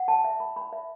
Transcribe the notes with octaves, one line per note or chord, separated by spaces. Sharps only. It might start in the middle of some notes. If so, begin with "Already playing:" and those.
Already playing: F#5
A5
E5
B5
B5
E5